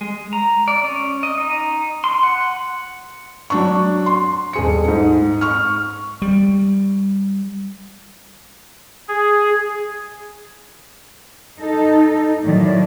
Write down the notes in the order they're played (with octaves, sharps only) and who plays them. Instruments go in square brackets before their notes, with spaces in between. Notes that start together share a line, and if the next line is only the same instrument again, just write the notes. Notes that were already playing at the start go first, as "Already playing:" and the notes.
[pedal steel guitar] G#3
A#5
D5
C#4
D#5
D#4
C6
F#5
[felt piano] F#3 D4 C#6
C6
D#1 G#4 C#7
G#2
C#6 F6
[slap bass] G3
[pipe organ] G#4
[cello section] D#4 A4
A2 D#3 F#3 D5